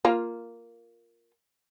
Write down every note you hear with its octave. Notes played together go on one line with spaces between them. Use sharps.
A#3 F4